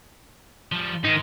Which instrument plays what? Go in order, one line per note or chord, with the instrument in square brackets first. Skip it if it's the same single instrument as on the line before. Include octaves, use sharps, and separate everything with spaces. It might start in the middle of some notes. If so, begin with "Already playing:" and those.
[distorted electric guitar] F3 G3
[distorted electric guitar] G#2 [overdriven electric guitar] D#3 D#4